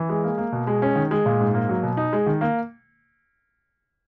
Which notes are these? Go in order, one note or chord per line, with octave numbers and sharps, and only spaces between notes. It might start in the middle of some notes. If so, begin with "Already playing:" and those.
Already playing: E3
G#3
A#3
A#3
B2
G#3
C#4
D#3
G#3
A#2
G#2
A#3
F#3
B2
D#4
G#3
D#3
A#3